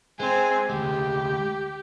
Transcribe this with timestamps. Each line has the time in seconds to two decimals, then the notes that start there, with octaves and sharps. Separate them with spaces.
0.20 G#3 C4 G#5
0.70 D2 G#3 G4